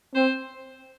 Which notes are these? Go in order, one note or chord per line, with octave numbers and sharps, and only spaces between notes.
C4 C5